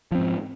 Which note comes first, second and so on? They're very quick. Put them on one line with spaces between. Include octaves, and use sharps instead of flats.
F3 C4 G#2